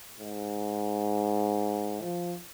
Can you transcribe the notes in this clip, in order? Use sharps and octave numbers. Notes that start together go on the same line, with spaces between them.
G#2
F3